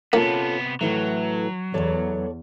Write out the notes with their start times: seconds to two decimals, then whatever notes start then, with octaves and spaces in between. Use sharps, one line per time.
0.13 C3 A#3 B3 C#4 F4 A4
0.81 A2 E3 F#3 A3
1.74 E2 A4 C#5 D5